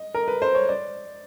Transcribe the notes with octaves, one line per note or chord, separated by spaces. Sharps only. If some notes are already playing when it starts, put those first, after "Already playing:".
Already playing: D#5
A#4
B4
C5
C#5
D5